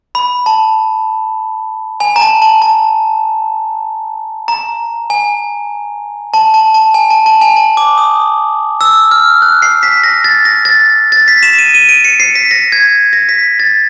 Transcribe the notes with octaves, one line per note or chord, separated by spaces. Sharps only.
B5
A5
G#5
A#5
A5
A5
A5
A#5
G#5
A5
A5
A5
G#5
A5
A5
G#5
A5
D6
D#6
E6
F6
F#6
C7
B6
A#6
A6
A#6
A6
A6
B6
E7
D#7
D#7
D7
C#7
C7
B6
A#6
G#6
A#6
B6
A6